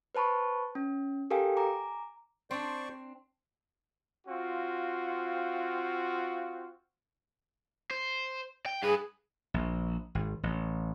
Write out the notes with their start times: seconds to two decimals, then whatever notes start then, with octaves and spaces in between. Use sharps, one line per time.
0.15 B4 C5 A5 B5 C#6
0.75 C#4
1.31 G4 A4 A#4 F5 G5 G#5
1.57 G#5 A#5 D6
2.51 C4 D4 C5 D5 C#6
4.28 C4 F4 F#4 F5
7.91 C5
8.66 G5
8.83 G2 G#4 B4
9.54 A#1
10.15 G#1
10.43 A1